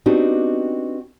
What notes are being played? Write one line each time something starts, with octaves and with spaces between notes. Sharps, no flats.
B3 C4 D4 D#4 F#4 G4